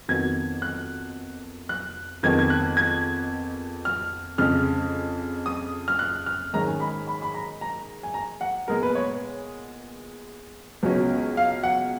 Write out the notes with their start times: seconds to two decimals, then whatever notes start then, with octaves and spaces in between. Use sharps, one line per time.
0.08 F2 D#3 F#3 B3 G#6
0.62 F#6
1.69 F#6
2.23 F2 D#3 G#3 B3 G#6
2.39 G#6
2.50 F#6
2.77 G#6
3.85 F6
4.38 F2 C#3 G#3 F6
5.46 D#6
5.88 F6
5.99 F#6
6.26 F6
6.53 G#2 D#3 G#3 C#4 A#5
6.67 G#5
6.80 B5
7.07 B5
7.22 B5
7.34 A#5
7.61 A#5
8.03 G#5
8.14 A#5
8.41 F#5
8.68 A#2 G#3 B3 A#4
8.83 B4
8.95 C#5
10.83 C#2 B2 F#3 C#4
11.37 F5
11.63 F#5